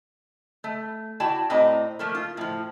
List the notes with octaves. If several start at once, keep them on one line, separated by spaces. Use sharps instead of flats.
A3
E4 F#4 D5 G5 A5
A2 C4 D5 D#5 A#5
F3 A3 A#3
F4
A2 F3